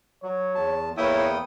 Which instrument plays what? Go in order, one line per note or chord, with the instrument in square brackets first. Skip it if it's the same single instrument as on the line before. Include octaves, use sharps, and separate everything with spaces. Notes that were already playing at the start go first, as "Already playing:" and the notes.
[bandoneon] F#3 [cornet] C#5
[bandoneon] E2 A5
[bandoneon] E2 A#3 [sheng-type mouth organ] B3 G5 D#6 [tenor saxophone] E4 [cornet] C#5